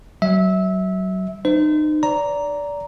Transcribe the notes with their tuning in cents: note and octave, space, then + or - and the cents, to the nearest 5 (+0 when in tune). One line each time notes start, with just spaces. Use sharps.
F#3 +30 E5 -20
D#4 -35 C5 -35
D5 -20 A#5 +0